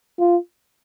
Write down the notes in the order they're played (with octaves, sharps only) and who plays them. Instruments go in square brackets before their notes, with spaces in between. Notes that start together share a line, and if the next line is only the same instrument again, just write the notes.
[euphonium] F4